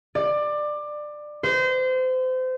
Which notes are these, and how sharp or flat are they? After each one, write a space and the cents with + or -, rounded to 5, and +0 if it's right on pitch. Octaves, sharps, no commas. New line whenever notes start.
D5 +20
C5 -30